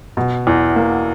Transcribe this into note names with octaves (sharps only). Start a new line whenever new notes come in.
B2
E2
A#3